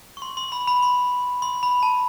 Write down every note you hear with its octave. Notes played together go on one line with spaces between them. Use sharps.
C#6
C6
C6
B5
B5
C6
C6
B5
A5